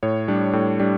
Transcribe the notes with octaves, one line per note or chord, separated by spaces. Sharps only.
A2 C#5
G3 D4
A2
G3 D4